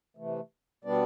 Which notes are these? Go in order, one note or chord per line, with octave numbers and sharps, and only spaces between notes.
C3 E3 A3
B2 G3 B3 D4 D5